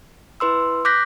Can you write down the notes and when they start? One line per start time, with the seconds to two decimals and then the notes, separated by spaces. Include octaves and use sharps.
0.40 E4 B4 C6 E6
0.85 D6 F#6 G6 A#6 B6